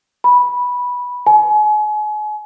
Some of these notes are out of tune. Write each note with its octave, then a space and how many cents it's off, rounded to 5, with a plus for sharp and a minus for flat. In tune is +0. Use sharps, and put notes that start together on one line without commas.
B5 -10
G#5 +35